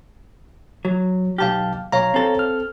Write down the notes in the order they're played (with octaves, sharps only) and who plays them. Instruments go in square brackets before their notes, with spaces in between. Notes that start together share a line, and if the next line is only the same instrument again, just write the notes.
[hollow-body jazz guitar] F#3 [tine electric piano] C#5
[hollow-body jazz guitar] B1 G4 [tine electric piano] F5 A5 F6
[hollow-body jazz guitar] B1 [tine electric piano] C#5 F5 A#5
[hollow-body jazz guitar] C4 A4
[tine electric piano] F6